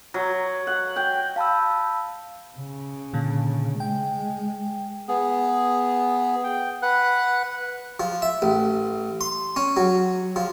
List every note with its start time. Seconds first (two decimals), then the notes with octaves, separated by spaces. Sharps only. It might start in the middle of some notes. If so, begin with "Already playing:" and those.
0.14 F#3
0.67 F#5
0.96 G5
1.36 F5 A5 B5 E6
2.58 C#3
3.13 A#2 D3
3.80 G#3 G5
5.08 B3 G#4
6.44 G5
6.82 B4 F#5 F#6
8.00 F3
8.22 E5
8.42 A1
9.21 C6
9.56 C#4
9.77 F#3
10.36 F3